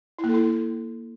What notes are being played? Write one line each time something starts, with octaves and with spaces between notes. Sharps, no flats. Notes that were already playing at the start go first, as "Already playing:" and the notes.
E4
A#3
A4
E4